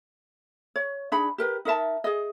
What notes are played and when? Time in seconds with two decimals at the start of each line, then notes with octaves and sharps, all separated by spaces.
0.76 C#5
1.12 D4 D#4 G#4 B5
1.38 G4 A#4 B4
1.65 D#4 A#4 E5 A5
2.04 G#4 D#5